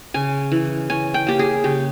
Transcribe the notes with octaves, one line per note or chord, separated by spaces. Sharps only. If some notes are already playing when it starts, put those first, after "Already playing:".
C#3 G#5
E3
C#4 G#5
G5
A#3 G4
G#4
C#3 G4